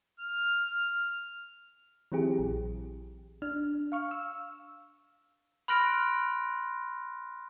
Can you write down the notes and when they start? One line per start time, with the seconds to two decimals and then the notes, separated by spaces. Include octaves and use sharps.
0.20 F6
2.12 E3 F#3 C4 E4 G4 G#4
2.39 A#1
3.42 D4 F6
3.92 F5 C#6 F6
4.11 E6
5.68 B5 C6 F6 F#6 A#6 D7